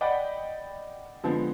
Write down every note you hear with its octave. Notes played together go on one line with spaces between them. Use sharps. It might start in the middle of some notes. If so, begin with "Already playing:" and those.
D5 D#5 F#5 G5 B5
D3 F3 G#3 B3 C4